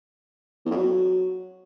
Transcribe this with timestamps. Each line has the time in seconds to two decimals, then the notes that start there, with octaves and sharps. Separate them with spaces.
0.66 E2
0.71 F2
0.77 F#3